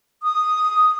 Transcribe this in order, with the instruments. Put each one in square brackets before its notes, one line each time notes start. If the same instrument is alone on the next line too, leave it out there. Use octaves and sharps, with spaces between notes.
[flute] D#6